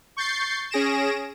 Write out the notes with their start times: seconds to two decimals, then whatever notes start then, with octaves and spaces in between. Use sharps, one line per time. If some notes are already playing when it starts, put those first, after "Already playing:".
0.17 C#6 G6 A6 C7
0.71 C#4 G#4 A#6 D7 E7